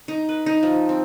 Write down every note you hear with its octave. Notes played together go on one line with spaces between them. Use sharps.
D#4
B4
D#4
F3
C4